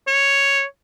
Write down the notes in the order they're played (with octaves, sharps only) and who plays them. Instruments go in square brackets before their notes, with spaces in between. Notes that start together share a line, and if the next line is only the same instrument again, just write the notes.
[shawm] C#5